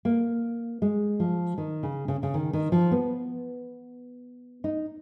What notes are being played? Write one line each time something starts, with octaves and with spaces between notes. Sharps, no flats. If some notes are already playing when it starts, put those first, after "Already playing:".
A#3
G#3
F3
D#3
C#3
C#3
C#3
D#3
D#3
F3
B3
D#4